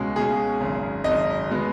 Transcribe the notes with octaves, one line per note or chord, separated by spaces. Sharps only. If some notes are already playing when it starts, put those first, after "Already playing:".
Already playing: C#2 B2 G#3 C#4
C#2 B2 G#3 C#4 G#4
G#1 F#2 C#3
G#1 F#2 C#3 D#5
B2 G#3 B3